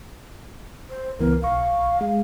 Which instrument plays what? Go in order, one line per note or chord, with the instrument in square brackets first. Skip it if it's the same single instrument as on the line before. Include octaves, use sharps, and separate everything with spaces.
[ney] C5
[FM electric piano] C#2 E3 B3 [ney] A#4
[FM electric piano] B1 C#6 [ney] F5
[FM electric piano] G#3